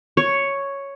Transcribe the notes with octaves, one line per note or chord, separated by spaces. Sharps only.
C#5